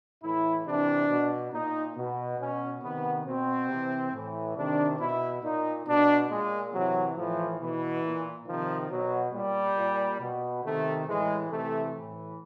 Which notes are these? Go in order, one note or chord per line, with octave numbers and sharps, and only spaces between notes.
A2 E3 E4
C3 E3 D4
B2
A#2 D#4
B2
B2 C#4
C3 D#3 B3
B2 C4
C3 E3
A2 E3
C3 D#3 D4
B2 E4
A#2 D#4
B2 D4
A#2 G#3
C3 E3 F#3
A2 E3 F3
B2 E3
A#2
C3 D#3 F3
B2 F#3
A#2 G3
A#2
B2
C3 D#3 A3
A2 E3 G#3
C3 E3 A3
A2 E3